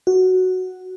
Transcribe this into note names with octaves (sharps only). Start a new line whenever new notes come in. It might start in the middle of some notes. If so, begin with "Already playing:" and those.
F#4